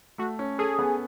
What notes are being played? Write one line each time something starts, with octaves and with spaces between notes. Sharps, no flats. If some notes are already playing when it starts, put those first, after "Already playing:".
A3 F#4
C#4
G#4 A4
B3